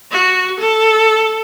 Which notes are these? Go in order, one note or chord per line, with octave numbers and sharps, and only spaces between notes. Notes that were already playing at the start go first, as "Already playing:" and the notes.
F#4
A4